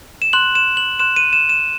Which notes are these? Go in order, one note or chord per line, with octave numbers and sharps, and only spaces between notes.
E7
C6 F#6 F#7
E7
F#7
C6 F#6 E7
D#7
E7
E7